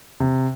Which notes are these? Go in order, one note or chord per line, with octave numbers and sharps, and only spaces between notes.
C3